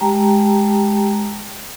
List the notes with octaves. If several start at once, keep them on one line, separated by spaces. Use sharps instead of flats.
G#3 G4 G5 A5 A#5